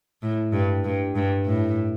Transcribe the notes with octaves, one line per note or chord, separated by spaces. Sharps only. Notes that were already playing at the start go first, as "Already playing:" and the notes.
A2
G2
G2
G2
A2